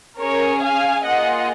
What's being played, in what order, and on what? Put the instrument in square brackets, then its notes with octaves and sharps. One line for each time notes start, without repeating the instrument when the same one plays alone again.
[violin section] C#4 G#4 A#4 C#5
F5 G#5
A#3 F4 G#4 D#5 F#5